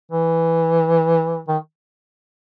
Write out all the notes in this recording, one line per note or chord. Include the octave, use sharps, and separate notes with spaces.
E3
D#3